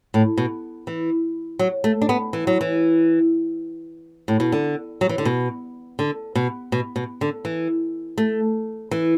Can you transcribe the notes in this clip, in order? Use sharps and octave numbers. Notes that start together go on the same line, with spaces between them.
A2
B2
E3
F#3
A3
D4
B3
E3
F#3
E3
A2
B2
D3
F#3
E3
D3
B2
D3
B2
B2
B2
D3
E3
A3
E3